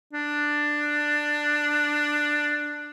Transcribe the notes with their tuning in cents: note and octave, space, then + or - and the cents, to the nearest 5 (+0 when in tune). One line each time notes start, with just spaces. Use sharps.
D4 +10